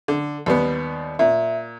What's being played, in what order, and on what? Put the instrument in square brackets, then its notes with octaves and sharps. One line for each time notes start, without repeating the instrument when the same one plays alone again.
[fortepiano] D3
D#2 G3 B3
[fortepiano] A#2 [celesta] E5